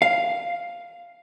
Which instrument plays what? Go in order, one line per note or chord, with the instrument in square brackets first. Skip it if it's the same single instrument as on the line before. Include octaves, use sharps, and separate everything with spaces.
[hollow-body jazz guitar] F5